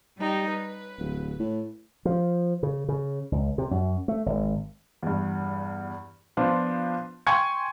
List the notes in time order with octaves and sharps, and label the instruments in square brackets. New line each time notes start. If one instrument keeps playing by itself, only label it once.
[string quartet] G3 D#4 G4
B4
[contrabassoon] D1
A2
[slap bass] F3
C#3
C#3
C#2
C3
F#2
A3
G#1
[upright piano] E2 G2
F3 B3 D4 F4 C5
G5 G#5 C6 C#6 G#6 C#7